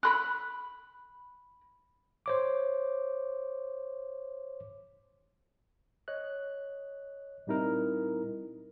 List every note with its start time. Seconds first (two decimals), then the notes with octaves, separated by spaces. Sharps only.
0.03 B5 C6 F#6
2.26 C5 C#5 D6
6.08 C#5 D#5 F#6
7.47 A#2 G3 C4 D#4 E4 A#4